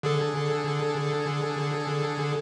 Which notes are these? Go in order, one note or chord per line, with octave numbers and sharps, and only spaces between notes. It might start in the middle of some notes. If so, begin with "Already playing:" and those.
D3 G#4 A4